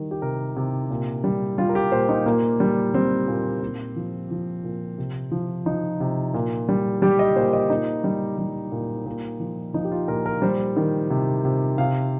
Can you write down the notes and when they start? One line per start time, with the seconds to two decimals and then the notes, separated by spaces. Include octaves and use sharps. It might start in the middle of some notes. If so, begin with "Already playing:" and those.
Already playing: D#3 G3
0.11 G4
0.22 C3 A#4
0.56 C3
0.90 A#2
1.24 G3
1.58 G3 F4
1.69 A#4
1.75 G4
1.92 A#2 C5
2.09 D#4
2.26 A#2 A#3
2.60 G3
2.94 G3 C4
3.28 A#2
3.62 A#2
3.96 F3
4.31 F3
4.64 A#2
4.98 C3
5.32 F3
5.66 F3 D#4
6.00 C3
6.34 A#2
6.69 G3
7.02 G3 G4
7.19 D#5
7.36 A#2 C5
7.53 D#5
7.70 A#2 D#4
8.04 G3
8.38 G3
8.72 A#2
9.06 A#2
9.40 F3
9.74 F3 D#4
9.84 G4
9.91 F4
10.08 A#2 A#4
10.26 A#4
10.42 G3 C5
10.76 D#3
11.10 C3
11.45 C3
11.78 C3 F5